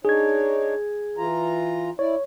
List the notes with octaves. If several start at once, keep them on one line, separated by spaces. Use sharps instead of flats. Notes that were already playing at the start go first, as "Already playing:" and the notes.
D4 D#4 G#4 C#5 G#6
E3 F4 A#5
E4 C#5 D5